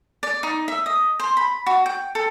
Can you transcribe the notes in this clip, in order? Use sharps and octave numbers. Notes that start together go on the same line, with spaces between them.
D5
D#4
E5
D#5
C5
B5
F#4
G5
A4